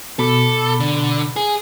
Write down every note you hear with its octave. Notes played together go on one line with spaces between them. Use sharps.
B2 A4 B5 D6
D3
G#4